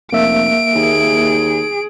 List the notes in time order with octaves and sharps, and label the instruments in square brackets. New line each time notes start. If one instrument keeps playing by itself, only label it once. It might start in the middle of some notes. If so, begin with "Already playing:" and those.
[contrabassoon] F1 [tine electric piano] A#3 E5 [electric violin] D7
[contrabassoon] D#2 [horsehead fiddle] G#4